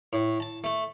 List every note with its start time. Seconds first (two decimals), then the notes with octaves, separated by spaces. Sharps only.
0.13 A2
0.40 A5
0.64 A3